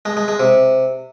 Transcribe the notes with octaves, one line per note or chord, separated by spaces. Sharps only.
G#3
G#3
G#3
C3